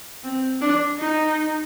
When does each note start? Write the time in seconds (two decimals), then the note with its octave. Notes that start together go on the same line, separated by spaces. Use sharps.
0.24 C4
0.61 D4
0.98 D#4